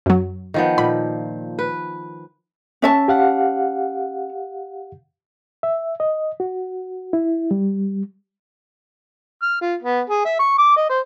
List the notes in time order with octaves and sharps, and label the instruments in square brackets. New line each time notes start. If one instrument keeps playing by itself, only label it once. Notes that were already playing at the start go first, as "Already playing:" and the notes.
[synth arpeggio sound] F#2 F#3
[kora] D#3 F3 B3
[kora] A#2 [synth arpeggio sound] B5
[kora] B4
[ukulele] C#4 E5 A5
[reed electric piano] G4 F5 F#5
E5
D#5
F#4
E4
G3
[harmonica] F6
F4
B3
G#4
E5
C#6
D6
D#5
C5